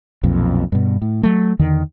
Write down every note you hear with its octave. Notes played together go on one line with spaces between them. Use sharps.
B1 F2 A#2
G2 B2
A2
F#3 A3
E2 D3 D#3